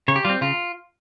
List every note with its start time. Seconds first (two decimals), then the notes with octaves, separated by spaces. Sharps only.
0.08 C#3 C#5
0.16 G4
0.25 G3 C4 F4
0.41 C#3 F4